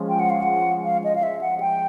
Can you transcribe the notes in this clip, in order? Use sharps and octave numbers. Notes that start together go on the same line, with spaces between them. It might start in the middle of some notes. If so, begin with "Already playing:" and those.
Already playing: F3 G#3 C#4 F4
G5
F#5
F5
F#5
F5
D#5
F5
E5
F#5
G5